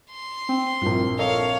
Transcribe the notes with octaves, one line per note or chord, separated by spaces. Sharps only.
C6
C4
A#1 G2 E4 F4 A#4
A4 A#4 C#5 D#5 F5